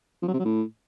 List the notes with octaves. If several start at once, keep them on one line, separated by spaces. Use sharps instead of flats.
F3
F#3
C3
F#3
A2